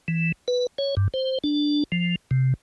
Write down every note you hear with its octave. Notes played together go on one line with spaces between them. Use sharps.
E3
B4
C#5
G2
C5
D4
F3
C3